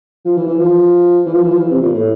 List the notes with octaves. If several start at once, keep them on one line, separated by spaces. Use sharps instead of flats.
F3
E3
E3
F3
E3
F3
E3
F3
E3
C3
A#2
A2